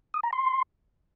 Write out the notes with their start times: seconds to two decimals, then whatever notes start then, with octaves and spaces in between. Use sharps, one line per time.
0.14 D#6
0.23 A#5
0.33 C6